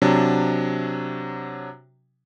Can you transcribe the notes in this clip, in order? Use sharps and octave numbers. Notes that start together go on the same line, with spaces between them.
C3 F#3 D4